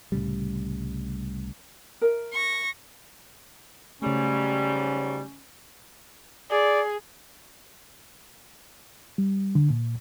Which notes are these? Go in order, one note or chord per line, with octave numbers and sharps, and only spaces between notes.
C2 A2 C#3 G3
A#4 E5
C#6 A#6
G#2 C#3 F#3 G3 A3 C#4
G#4 D5
G3
D3
A#2